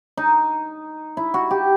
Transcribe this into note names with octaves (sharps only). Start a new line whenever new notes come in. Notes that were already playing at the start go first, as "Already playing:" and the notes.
D#4
E4
F#4
G4